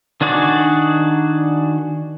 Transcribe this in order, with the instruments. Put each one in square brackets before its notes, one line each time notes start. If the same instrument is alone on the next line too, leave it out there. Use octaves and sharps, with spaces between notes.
[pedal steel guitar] D#3 D4 F#4 G#4 D5